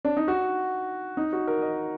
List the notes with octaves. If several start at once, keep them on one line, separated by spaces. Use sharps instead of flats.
D4
D#4
F#4
D#4
F#4
A#4
D#5